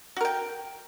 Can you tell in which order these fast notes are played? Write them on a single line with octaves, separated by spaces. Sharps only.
F#4 A#4 G5